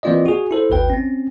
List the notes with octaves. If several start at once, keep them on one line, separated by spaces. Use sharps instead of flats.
E3 A#3 C4 F4 D5 D#5
F#4 G#4
E4 A4 C5
G#1 D#2 B4 G5
C4 C#4